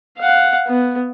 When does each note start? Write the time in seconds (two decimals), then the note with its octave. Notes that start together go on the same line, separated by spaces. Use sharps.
0.18 F5 F#5
0.67 B3